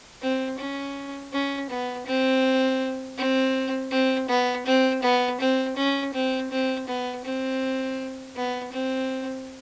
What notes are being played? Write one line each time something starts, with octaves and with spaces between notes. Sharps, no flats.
C4
C#4
C#4
B3
C4
C4
C4
B3
C4
B3
C4
C#4
C4
C4
B3
C4
B3
C4